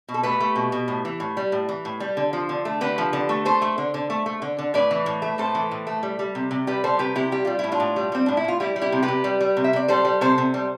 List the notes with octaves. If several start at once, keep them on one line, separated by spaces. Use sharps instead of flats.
B2
A4
A3 G4 B4
A3
B2
B2
A2
E3
A2
G3
A2
E3
A2
G3
D3
F3
D3
A3
D3 G4 B4
F3
D3
A3
A3 A4 C5
A3
D3
D3
A3
A3
D3
D3
A2 B4 D5
E3
A2
A3
A2 A4 C5
E3
A2
A3
G3
G3
C3
C3
G3 G4 B4
G3 A4 C5
C3 G4 B4
C3 E4 G4
G3 G4
G3 F4
A2 E4
D4 F4
A2
G3
G3 C4
A2 D4
E4
A2 F4
G3 E4 G4
G3
E4 G4
C3
G4 B4
C3
G3
G3
C3
E5
C3 D5
G3 A4 C5
G3
C3 A4 C5
C3
G3